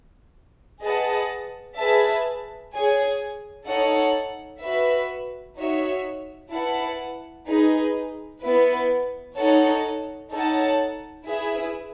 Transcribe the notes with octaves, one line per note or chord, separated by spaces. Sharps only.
G#4 B4 D#5 F#5 A5
G#4 B4 E5 A5
G#4 C#5 G#5
D#4 A4 C#5 F#5
F#4 B4 E5
D#4 F#4 C#5 E5
E4 B4 F#5 A5
D#4 G#4 B4
B3 E4 B4
D#4 A4 C#5 F#5
D#4 A4 C#5 F#5 A5
E4 G#4 B4 E5